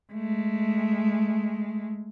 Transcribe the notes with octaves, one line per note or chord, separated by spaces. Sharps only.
G#3 A3